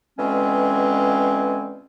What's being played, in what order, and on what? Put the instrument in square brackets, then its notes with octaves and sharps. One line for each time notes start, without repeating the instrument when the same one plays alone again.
[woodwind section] B2 D3 E3 G#3 C4 C#4